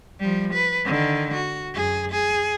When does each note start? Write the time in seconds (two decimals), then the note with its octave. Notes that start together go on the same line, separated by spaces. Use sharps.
0.20 F3 G3
0.53 B4
0.85 D3 D#3
1.33 F#4
1.74 F#2 G#4
2.11 G#4